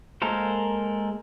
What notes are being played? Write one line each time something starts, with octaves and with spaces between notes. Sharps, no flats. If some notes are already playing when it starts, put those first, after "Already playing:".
G#3 A#3 A4 A#4 C5